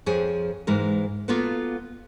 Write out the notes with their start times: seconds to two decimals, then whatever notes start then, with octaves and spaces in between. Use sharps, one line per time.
0.06 F2 F3 G#4 C#5
0.67 G#2 E3 G#3 A#4
1.28 A#3 B3 F4 F#4 A4 B4